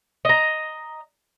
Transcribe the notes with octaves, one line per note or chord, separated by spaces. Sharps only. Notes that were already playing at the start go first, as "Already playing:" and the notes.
D#5 A#5